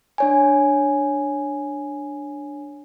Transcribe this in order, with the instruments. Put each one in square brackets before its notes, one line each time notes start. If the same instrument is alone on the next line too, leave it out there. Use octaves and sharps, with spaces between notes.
[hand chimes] D4 C#5 G#5